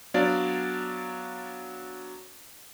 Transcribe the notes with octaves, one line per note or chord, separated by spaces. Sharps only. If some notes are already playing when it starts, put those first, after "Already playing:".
F#3 B3 D4 D5 F5